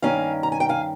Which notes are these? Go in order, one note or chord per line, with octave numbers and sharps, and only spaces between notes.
G2 D#3 A#3 C#4 F5 G#5
A#5
G#5
G5
F5 G#5